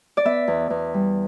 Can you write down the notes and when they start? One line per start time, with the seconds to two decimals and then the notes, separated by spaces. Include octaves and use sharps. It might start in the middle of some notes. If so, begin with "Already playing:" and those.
0.17 D5
0.25 B3 E5
0.48 E2
0.70 E2
0.94 G3